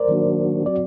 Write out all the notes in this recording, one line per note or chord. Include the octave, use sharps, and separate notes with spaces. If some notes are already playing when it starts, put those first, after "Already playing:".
Already playing: A#4 C5 D5
D#3 F#3 A#3 D4 F#4
F#3 C4 F#4 D5